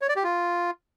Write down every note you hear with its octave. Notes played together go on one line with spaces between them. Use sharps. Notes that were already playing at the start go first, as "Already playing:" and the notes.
C#5
D5
G4
F4